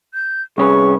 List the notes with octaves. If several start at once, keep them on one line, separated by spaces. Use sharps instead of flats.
G6
C2 C#4 G#4 B4 C#6